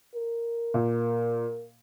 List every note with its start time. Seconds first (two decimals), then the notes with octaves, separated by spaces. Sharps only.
0.15 A#4
0.74 A#2